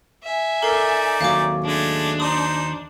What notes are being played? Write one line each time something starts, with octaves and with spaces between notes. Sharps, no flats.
E5 G#5
D#4 A4 A#4 D5 C7
D#2 F#3 F5 D6
G#3 A3 D4
D#4 C5 D#6